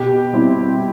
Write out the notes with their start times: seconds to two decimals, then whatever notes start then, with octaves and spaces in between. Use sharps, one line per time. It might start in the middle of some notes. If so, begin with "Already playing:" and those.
Already playing: B2 G4
0.33 G3 C4 E4